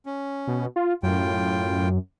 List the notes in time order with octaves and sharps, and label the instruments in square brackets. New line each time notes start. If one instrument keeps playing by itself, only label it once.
[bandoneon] C#4
[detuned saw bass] B2
F4
[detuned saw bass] F#2 [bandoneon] A2 F4 G5